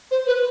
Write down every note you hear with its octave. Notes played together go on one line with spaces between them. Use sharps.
C5
B4